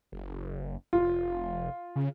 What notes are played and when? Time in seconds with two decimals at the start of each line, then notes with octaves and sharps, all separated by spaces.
0.12 F#1
0.93 F1 F4
1.96 C#3